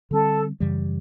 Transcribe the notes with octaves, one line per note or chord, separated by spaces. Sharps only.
D3 G3 C4 A4
F#2 C#3 E3 G3